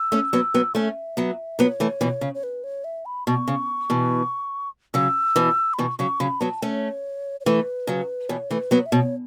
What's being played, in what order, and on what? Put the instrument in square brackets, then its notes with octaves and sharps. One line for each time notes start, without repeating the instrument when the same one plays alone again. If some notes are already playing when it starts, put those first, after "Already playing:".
Already playing: [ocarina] E6
[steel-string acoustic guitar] A3 C#4
F#3 B3
F#3 B3
[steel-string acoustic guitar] A3 C#4 [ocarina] E5
[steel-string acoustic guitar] F#3 B3
[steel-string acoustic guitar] F#3 B3 [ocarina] C#5
[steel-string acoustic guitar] E3 A3
B2 E3
C#3
[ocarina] C#5
B4
C#5
E5
B5
[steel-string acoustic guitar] B2 [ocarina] C#6
[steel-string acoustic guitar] C#3
B2 E3
[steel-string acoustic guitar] C#3 F#3 [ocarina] E6
[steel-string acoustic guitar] B2 E3
[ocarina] B5
[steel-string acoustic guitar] B2 E3 [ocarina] C#6
[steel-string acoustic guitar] C#3 F#3 [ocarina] C#6
[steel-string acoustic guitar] C#3 F#3 [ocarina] B5
[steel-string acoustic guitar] F#3 B3 [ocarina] A5
[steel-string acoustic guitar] A3 C#4 [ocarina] C#5
[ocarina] C#5
[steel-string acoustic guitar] E3 A3 [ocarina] B4
[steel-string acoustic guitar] C#3 F#3
[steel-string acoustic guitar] B2 E3 [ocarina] C#5
[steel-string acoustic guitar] E3 A3 [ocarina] B4
[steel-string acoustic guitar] F#3 B3 [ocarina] C#5
[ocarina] E5
[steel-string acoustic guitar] B2 [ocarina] C#5